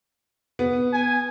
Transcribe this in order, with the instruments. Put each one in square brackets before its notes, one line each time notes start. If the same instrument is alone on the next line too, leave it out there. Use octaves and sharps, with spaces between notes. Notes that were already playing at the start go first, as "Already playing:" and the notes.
[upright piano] B3
[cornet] G#5